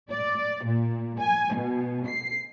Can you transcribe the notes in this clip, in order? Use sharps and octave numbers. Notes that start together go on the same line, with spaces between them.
D5
A#2
G#5
B2
C7